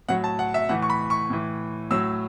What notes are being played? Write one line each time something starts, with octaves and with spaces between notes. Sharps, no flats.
A2 F#3 F#5
A5
F#5
E5
A2 E3 F#5
C#6
B5
C#6
A2 E3
A2 F#3 E6